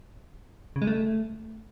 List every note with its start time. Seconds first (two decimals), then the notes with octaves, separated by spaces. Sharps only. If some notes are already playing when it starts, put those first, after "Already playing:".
0.76 C#3
0.82 G#3
0.87 A3